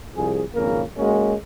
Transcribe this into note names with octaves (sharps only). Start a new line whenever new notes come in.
C2 F3 G#4
G#1 F2 C#3 A#3 A#4
G#3 A#3 C#4 F#4